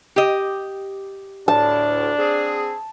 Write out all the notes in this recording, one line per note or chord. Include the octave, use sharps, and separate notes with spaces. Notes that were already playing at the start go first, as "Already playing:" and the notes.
G4 D#5
D2 A2 D4 A5
C4 G#4